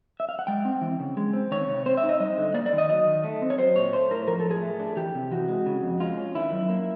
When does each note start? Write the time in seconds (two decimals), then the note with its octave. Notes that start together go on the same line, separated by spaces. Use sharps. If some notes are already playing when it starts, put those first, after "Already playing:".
0.20 E5
0.29 F5
0.39 F#5
0.47 G#3 G5
0.65 C4
0.81 E3
1.00 C#3
1.17 G#3
1.33 C4
1.52 D#3 C#5
1.68 C3
1.86 C4 C5
1.97 E5
2.03 D#4
2.09 D#5
2.20 G3 D#5
2.37 D3
2.54 A#3 D5
2.66 D5
2.73 D#3
2.78 D#5
2.89 F#3 D#5
3.07 D#3
3.24 A3
3.42 C4
3.50 C#5
3.58 F#3 C5
3.76 A#2 C#5
3.93 A3 C5
4.11 A2 A#4
4.28 F3 A#4
4.40 A4
4.45 A2
4.51 G#4
4.62 A3
4.79 D4
4.97 E3 G4
5.14 C3
5.31 E3 F#4
5.48 G#3
5.66 C#3
5.83 F2
6.00 G#3 F4
6.17 C#4
6.35 D#3 E4
6.52 F#2
6.69 A#3